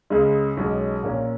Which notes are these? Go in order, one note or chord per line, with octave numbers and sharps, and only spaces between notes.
C#2 C#3 G#3
B1 B2 G#3 C#4
A#1 A#2 A#3 C#4